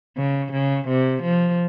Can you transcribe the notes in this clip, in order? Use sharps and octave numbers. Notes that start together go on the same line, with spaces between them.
C#3
C#3
C3
F3